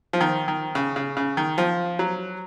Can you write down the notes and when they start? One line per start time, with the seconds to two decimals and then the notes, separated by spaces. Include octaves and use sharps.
0.13 F3
0.21 D#3
0.48 D#3
0.75 C#3
0.96 C#3
1.17 C#3
1.37 D#3
1.58 F3
1.99 F#3